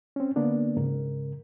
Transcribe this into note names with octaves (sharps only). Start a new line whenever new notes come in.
C4 C#4
D3 A#3 B3 D4
G#2 C#3 A#4